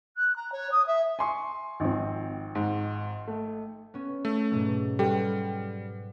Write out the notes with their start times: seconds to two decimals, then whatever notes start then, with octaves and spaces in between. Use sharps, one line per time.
0.17 F#6
0.36 A#5
0.52 C#5
0.71 D#6
0.86 E5
1.19 G#5 C6 C#6
1.80 G#1 F3 C4
2.55 G#2
3.27 A3
3.94 B3 C#4
4.25 A3
4.51 G#2 B2 F#3
4.99 G3 G4 A4 B4 C5 F#5 G5